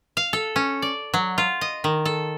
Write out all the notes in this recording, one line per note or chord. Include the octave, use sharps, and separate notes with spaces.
F5
A4
C#4
D5
F#3
F4
D#5
D#3
A4